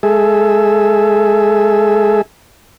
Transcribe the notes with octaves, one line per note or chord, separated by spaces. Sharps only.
G#3 G#4 A4 E5